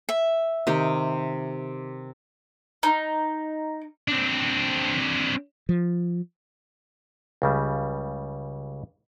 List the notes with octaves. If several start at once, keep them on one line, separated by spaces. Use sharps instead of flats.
E5
C3 D#3 G4
D#4
C4 D4
F3
C#2 C#3 G3